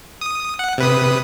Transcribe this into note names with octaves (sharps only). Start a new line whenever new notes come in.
D#6
F#5
C3 B4 D#6